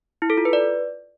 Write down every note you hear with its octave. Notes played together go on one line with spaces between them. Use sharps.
E4
A4
F4
B4
D5